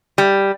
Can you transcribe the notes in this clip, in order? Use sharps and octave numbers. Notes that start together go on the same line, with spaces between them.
G3